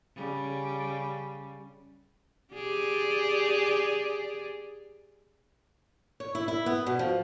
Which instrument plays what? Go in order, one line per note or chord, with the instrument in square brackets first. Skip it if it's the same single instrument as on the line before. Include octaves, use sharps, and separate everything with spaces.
[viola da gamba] C#3 G3
G4 G#4 D5
[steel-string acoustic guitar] C#5
E4
E4
B3
B2
F3